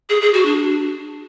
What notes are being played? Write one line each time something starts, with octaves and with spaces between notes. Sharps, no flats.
G#4
G#4
F#4
D4